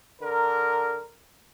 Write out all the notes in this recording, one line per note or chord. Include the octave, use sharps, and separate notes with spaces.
D3 A#4